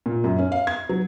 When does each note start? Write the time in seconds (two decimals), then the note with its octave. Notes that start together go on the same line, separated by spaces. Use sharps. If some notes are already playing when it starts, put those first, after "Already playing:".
0.06 A#2
0.24 F#2
0.39 C#4
0.52 F5
0.67 G#6
0.89 F#3